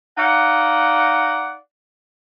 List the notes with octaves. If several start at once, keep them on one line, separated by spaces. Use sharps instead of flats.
D#4 D5 F5 F#5